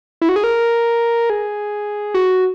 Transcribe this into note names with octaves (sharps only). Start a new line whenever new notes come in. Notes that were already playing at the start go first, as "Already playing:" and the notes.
E4
F#4
G#4
A#4
G#4
F#4